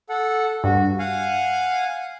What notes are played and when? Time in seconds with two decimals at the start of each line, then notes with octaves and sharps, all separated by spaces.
0.09 A4 F#5
0.64 G2 F#4
0.99 F5 F#5 G#5